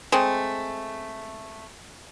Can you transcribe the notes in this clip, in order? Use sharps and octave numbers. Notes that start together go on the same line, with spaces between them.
G#3 A3 C4